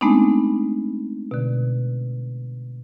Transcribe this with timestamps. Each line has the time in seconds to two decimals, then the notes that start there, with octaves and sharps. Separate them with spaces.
0.01 G#3 A3 B3 C4 D4 D#4
1.31 B2 D3